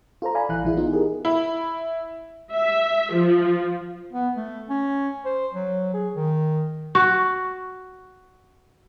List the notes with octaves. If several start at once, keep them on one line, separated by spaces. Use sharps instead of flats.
F4 A4 C5 A#5
D5 F5 G#5 A#5 B5
A#1 E3 E4 F5 F#6
A#1 E3 E4 G#4
B3 D#4 F4
G4 G#4 A#4
E4
E5
F3
B3
A3
C#4
C5
F#3
G#4
D#3
F#4 C#6